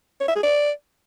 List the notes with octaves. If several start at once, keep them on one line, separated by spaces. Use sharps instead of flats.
C#5
E5
G#4
D5